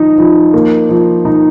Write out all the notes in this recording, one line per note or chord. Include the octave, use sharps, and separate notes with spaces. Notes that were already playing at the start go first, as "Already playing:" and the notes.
Already playing: F3 D#4
F3
A#3
F3
D#4